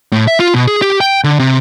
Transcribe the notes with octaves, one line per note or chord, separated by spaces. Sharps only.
A2
E5
F4
B2
G#4
G4
G5
D3
C3